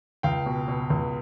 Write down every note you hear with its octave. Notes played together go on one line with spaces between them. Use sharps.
C#2 F5 G5
B2
B2
C#2